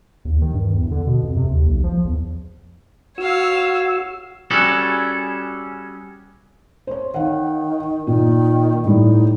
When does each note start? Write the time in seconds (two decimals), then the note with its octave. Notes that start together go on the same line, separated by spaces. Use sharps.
0.25 D#2
0.42 D#3
0.54 G2
0.75 E2
0.91 D3
1.07 B2
1.23 F2
1.37 C3
1.49 D#2
1.68 B1
1.84 F3
2.05 E2
3.18 F#4 C#5 F5 E6
4.51 G3 C#4 F#4 G#4 A4
6.87 C5 C#5
7.14 D#3 F5 F#5
8.07 A#2 D#3
8.84 A2 G3 D#4